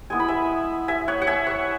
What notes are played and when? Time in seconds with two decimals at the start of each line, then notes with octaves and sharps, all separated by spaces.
0.10 G#3 B3 E4 G#5
0.20 B5
0.28 E5 G#5
0.88 E5 G#5
1.08 C#5 F#5
1.22 F#5
1.27 E5 G#5
1.46 C#5 F#5